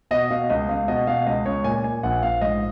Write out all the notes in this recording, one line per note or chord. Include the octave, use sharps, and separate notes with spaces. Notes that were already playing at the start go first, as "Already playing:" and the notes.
B2 D#5
B2 F5
C#2 D#5
C#2 F5
B2 D#5
B2 F5
C#2 D#5
C#2 C#5
A#2 G#5
A#2 G#5
A#1 F#5
A#1 F5
G#2 D#5